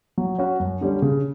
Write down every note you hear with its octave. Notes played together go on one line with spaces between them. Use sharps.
F#3
C#4 F#4
F#2
D3 G3 C#4
C#3